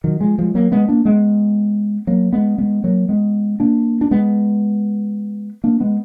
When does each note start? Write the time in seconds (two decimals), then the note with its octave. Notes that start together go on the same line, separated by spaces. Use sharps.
0.04 D#3 F#3
0.21 F3 G#3
0.39 F3 G#3
0.55 F#3 A#3
0.72 G#3 B3
0.88 A#3 D4
1.05 G#3 B3
2.07 F#3 A#3
2.33 G#3 B3
2.58 G#3 B3
2.84 F#3 A#3
3.09 G#3 B3
3.60 A#3 D4
4.01 D4
4.11 G#3 B3
5.64 A#3 D4
5.80 G#3 B3